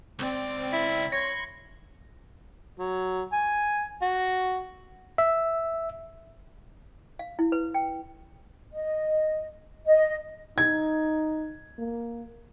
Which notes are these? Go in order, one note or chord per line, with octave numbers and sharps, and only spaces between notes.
C#2 C4 D5
E4
C#5 B5 C6 G#6 A#6 C#7
F#3
G#5
F#4
E5
F5
E4
B4
G5
D#5
D#5
D#4 G#6
A#3